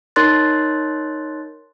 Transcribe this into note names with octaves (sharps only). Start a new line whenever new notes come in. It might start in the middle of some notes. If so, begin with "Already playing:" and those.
D#4 A#4 C#5 C6 F#6 A6